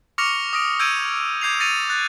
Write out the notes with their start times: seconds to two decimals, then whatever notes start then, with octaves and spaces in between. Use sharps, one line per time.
0.18 C#6 D6 F6 A#6 C#7 F7
0.53 D#6 A#6 D7
0.79 E6 G6 G#6 D7 D#7
1.41 D6 G6 G#6 C7 D#7 F7
1.60 A6 A#6 C#7 D#7 F7
1.89 F#6 A6